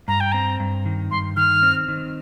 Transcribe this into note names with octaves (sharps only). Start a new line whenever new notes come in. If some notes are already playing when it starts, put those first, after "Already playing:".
G2 A#5
G5
C4 A#5
G2
D#3
G2 C6
D#3 F6
C4
D#3